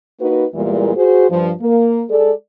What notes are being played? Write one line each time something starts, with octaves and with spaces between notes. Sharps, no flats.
A#3 D#4 F#4 B4
E2 A#2 E3 G3 G#3 A#3
F#4 G#4 C5
G2 F3
A#3
G#3 A4 D5